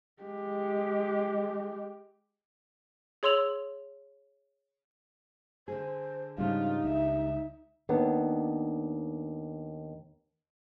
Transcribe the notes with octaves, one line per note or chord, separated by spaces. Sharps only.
G#3 G4
G#4 C#5 C6 E6 F7 F#7
D3 G#4 C5
G#2 C#3 F3 G3 D4 D#4 F4
C#2 E5
D#2 B3 D4